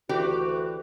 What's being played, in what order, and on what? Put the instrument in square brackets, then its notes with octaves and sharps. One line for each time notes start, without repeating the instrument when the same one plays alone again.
[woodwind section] D2 F#4 [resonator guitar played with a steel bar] E3 G4 D5